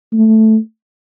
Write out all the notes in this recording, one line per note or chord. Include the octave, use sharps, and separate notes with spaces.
A3